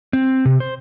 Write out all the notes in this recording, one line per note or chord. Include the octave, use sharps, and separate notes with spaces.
C4
C3
C5